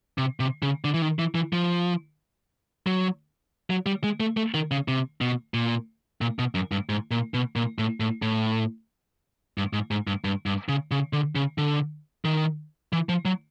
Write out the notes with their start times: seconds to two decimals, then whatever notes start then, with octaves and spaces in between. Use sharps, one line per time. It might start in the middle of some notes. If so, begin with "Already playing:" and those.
0.18 C3
0.40 C3
0.62 C#3
0.84 D3
0.94 E3
1.02 D#3
1.19 E3
1.35 E3
1.53 F3
2.87 F#3
3.70 F#3
3.86 G3
4.04 G#3
4.20 A3
4.37 A3
4.54 D#3
4.71 C#3
4.88 C3
5.21 B2
5.54 A#2
6.21 A#2
6.39 B2
6.55 F#2
6.72 G2
6.89 G#2
7.11 A#2
7.34 B2
7.56 A#2
7.78 A2
8.00 A2
8.22 A2
9.58 G2
9.73 G#2
9.91 G#2
10.07 G2
10.25 G2
10.46 G2
10.69 C#3
10.91 C#3
11.13 D3
11.35 C#3
11.58 D3
12.25 D#3
12.93 E3
13.09 F3
13.25 F#3